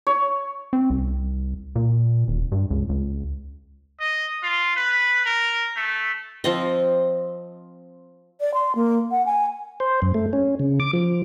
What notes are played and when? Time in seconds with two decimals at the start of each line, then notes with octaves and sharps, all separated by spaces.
0.07 C#5
0.73 C4
0.90 C2
1.76 A#2
2.28 D#1
2.52 G2
2.71 C#2
2.89 C#2
4.00 D#5
4.43 F4
4.76 B4
5.25 A#4
5.76 A3
6.44 F3 C4 D#5
8.41 D5
8.54 C6
8.75 A#3
9.11 F#5
9.26 G#5
9.80 C5
10.02 F#2
10.14 A3
10.33 C#4
10.60 C#3
10.80 D6
10.93 F3